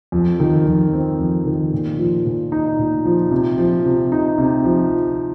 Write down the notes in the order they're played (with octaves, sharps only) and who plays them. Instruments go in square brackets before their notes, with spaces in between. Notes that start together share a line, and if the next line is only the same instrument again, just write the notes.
[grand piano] F2
D#3
F2
C4
F2
D#3
A#2
F3
A#2
D#4
A#2
F3
C3
F3
C3
D#4
C3
F3